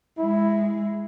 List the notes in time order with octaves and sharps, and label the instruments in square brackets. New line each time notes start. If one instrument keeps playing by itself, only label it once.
[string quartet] G#3 [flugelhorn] E4